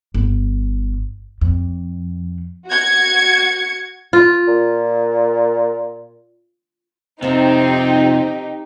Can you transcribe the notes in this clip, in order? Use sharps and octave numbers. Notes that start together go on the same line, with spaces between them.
G1
F2
F#4 G#6 C#7
F4
A#2
F2 C3 F3 C4 D#4 G4